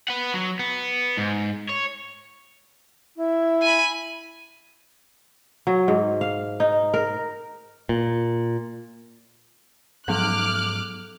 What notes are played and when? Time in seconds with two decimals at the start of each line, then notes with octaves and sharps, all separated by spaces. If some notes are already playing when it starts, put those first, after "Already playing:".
0.09 B4 F#5
0.34 F#3
0.59 B3
1.17 G#2
1.69 C#5
3.16 E4
3.62 G#5 B5
5.67 F#3
5.88 G#2
6.21 F5
6.60 D#4
6.94 A#4
7.89 A#2
10.08 G#2 F3 F#3 B3 A4 D6 F6 F#6